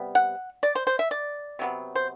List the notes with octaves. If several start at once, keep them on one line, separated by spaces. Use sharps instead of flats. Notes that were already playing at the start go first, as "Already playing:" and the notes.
Already playing: C3 G3 B3
F#5
D5
C5
C5
E5
D5
C3 F#3 B3
C5